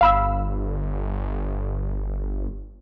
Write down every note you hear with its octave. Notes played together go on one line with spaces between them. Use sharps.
G1 F5 B5 E6